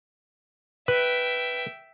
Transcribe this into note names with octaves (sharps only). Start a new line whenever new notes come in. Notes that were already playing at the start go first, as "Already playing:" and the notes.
B4 E5 G5